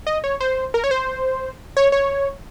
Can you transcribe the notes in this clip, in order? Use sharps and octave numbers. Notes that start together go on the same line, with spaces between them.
D#5
C#5
C5
A#4
C#5
C5
C#5
C#5